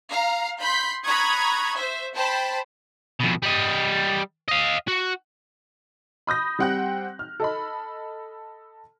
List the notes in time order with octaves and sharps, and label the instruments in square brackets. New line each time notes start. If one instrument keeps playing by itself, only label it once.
[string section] F5 A#5
B5 C6 G6 B6
A#5 B5 C#6 D#6 F#6 G#6
C5 E5
C5 G5 A5 B5
[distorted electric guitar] F2 B2
G3 D#5
D#5 F5
F#4
[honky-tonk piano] B5 D#6 G6 A#6
G3 C4 F#5 G5 F#6
F6
A4 D#5 B5